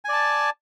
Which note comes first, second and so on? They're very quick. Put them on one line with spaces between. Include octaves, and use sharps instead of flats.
G#5 D5 A5